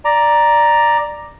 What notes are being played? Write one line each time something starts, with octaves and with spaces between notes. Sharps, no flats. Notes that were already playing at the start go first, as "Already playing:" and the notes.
D5 A#5